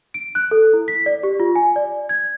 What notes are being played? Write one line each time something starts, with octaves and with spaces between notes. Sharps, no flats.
D7
F#6
A4
E4
B6
D5
G4
F4
G#5
D5
G#6